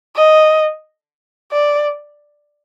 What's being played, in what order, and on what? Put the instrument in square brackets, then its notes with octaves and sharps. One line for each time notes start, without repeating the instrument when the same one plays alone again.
[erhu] D#5
D5